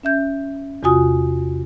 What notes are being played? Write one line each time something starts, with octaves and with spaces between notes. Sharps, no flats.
C#4 E5 G6
E2 C3 F4 F#4 G#5 D#6